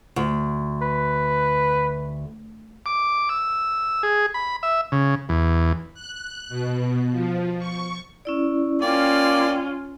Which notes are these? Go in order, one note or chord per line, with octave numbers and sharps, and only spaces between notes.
D2
B4
D6
E6
G#4
B5
E5
C#3
E2
F#6
B2
F3
C#6
C#4 E4 D5
A#3 C#4 F4 D5 G5